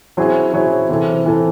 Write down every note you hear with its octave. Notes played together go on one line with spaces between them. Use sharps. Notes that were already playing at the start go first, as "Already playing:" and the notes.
F#3 C4 E4 G#4 C#5
F#3 C4 E4 G#4 C#5
C3 E3 C4 E4 A4
C3 E3 C4 E4 A4